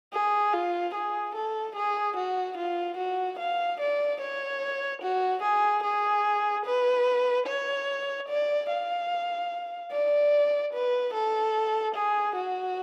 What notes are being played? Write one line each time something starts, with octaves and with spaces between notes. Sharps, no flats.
G#4
F4
G#4
A4
G#4
F#4
F4
F#4
F5
D5
C#5
F#4
G#4
G#4
B4
C#5
D5
F5
D5
B4
A4
G#4
F#4